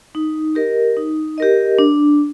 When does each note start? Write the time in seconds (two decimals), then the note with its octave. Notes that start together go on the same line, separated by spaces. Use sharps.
0.15 D#4
0.55 G4 A#4 D#5
0.97 D#4
1.38 G4 A#4 D#5
1.79 D4